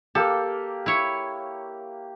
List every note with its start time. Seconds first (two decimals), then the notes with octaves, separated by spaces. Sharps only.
0.15 A#3 G4 A4
0.86 E4 C#5